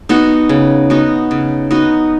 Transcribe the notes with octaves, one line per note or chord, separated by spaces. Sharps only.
B3 D#4 F#4
C#3
B3 D#4 F#4
C#3
B3 D#4 F#4